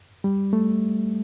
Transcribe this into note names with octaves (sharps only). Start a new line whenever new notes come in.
G3
A3